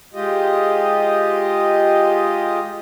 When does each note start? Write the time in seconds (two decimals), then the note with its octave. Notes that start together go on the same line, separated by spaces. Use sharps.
0.14 G#3 F4 G4 D#5